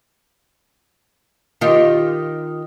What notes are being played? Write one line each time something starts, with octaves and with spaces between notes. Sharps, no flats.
D#3 F4 G4